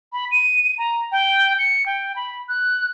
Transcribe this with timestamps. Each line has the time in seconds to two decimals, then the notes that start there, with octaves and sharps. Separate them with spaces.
0.13 B5
0.31 D#7
0.78 A#5
1.12 G5
1.59 C#7
1.86 G5
2.16 B5
2.49 F#6